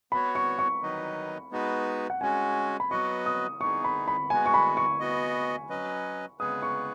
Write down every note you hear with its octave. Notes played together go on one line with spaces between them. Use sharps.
B3 F#4 C#5 B5
C#6
C#6
D#3 F#3 D#4 B4 D#5
G#3 B3 D#4 F#4 B4
F#5
G#3 C#4 F#4 G#5
B5
F#3 B3 F#4 B4 D#5 C#6
D#6
B3 D#4 G#4 C#6
B5
B5
G#3 B3 F#4 G#5
C#6
B5
C#6
B3 F#4 D#5
F#3 C#4 B4 D#5
C#3 G#3 B3 G#4 B4 D#6
C#6